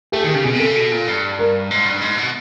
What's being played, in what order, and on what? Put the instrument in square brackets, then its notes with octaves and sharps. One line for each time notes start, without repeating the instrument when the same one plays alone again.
[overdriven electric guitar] A3 [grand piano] G4
[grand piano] G#4
[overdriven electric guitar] D#3
[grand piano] G4
[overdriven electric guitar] C#3
[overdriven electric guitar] B2 [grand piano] G#4
[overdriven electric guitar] C3 [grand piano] A4
[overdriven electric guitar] C#3
B2
A#2
G2
[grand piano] A#4
[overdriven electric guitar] G#2
G2
G#2
B2